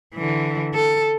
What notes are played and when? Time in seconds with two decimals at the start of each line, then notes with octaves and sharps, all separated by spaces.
0.15 D3 E3
0.74 A4